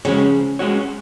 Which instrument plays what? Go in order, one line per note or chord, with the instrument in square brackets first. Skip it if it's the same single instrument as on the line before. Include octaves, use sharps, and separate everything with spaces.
[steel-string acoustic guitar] C#3 F3 [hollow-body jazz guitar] G#3 C#4 F#4 C#5
[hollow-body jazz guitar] G#3 C#4 F#4 C#5